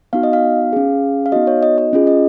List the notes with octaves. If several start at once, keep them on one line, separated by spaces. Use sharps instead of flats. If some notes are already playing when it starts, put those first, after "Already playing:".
B3 D#4 F#4 F5
D#5
F5
C#4 G#4
F5
B3 D#4 F#4 D#5
C#5
D#5
D#5
C#4 F4 G#4
D#5